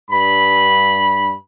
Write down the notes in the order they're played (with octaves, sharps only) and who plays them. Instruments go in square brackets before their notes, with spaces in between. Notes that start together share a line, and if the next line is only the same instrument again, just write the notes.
[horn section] G2 B5